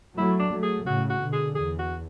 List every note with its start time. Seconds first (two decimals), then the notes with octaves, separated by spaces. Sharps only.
0.17 F#3 A3 E4
0.40 D4
0.51 F#3 A3
0.63 G#4
0.86 A2 C#3 F#4
1.10 F#4
1.21 B2 D3
1.33 G#4
1.55 E2 G#4
1.79 F#4